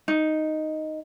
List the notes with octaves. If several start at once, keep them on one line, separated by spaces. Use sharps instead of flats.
D#4